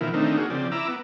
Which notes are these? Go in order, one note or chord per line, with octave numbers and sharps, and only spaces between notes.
B2 D#3 F3 E4 A#4
D#3 A3 C4 D4 D#4
A#3 F#4 G#4
C#3 F3 C4 D5
E4 A#5 D6 E6
B3